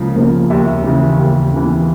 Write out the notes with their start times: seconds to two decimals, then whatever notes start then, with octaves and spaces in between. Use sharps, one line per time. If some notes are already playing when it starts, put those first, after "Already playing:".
Already playing: C#2 C#3 F3 A#3
0.15 C#3 F3 A#3
0.50 D#2 E5
0.84 C#3 E3
1.19 D#2
1.53 C#3 E3